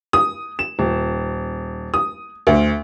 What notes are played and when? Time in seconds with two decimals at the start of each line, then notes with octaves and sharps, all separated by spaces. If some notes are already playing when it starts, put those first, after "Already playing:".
0.13 D#6
0.59 E7
0.79 D#1
1.94 D#6
2.47 D2